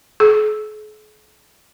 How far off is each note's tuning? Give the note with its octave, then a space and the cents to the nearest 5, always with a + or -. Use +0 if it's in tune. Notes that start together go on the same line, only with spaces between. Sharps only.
G#4 +45